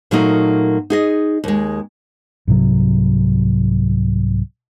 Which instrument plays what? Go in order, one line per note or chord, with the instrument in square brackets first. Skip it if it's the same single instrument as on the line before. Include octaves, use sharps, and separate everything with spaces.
[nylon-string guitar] A#2 F#3 A3 A#3 D#4
D#4 G#4 D#5
D#2 G#3
[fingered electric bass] C2 G#2 C3 F#3